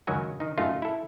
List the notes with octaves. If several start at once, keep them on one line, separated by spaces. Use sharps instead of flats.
C#2 F#2 D#3 F#3 F#4 G#5
D#3 D#4
F#2 A3 D#4 F4
E4 A4